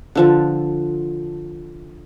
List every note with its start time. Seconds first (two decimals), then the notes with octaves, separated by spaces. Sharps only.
0.15 D3 F3 A4